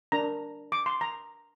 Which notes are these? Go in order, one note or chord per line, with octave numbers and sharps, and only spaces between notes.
D4 A#4 A#5
D6
C6
A#5